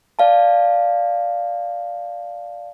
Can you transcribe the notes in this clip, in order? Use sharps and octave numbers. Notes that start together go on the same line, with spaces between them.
D5 F5 A5